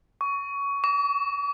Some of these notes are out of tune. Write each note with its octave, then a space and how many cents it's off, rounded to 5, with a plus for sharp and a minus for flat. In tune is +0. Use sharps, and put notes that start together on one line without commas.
C#6 +20
C#6 +45